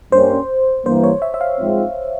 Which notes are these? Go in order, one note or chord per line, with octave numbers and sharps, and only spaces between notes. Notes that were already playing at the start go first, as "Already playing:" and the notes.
G2 G3 A#3 C#4 G4 C5
G2 E3 A#3 C5
C#5
E5
E5
F5
G#2 F3 C4